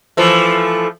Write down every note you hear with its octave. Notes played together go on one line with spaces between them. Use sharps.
E3 F3 A3